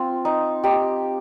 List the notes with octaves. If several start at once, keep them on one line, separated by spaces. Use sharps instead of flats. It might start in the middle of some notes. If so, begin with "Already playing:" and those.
Already playing: C4 F4
D#4
D#4 G4